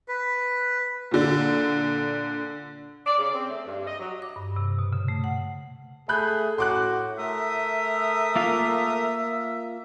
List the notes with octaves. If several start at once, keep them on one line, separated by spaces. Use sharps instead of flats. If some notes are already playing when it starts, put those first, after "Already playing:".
B4
A#2 D3
D5
C#3
C4
A3
G2
D#5
F#3
D6
G2
C3
B2
C#3
A3
F#5
A3 G#4 B5 F#6 G6
A2 F#4 C6 D6 F#6
A3 A#4 E5 D#6
A#3 F4 F5